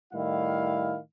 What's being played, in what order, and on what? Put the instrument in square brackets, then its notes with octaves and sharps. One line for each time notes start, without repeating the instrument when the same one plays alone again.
[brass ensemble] A2 D#3 G3 E4 F5